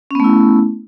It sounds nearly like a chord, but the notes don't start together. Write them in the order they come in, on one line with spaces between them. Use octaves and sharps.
C#4 B3 A3 E4